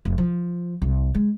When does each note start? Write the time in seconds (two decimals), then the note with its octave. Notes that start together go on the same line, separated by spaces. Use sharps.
0.05 F1
0.18 F3
0.82 C2
1.15 G#3